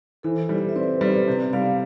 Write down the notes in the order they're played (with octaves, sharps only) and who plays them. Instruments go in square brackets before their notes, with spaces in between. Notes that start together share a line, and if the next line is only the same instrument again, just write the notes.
[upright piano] E3 [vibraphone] A4 C5
[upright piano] G3
[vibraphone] E5
[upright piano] C4 [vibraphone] B4 D5
[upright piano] G3
C3
[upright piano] G3 [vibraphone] D5 F5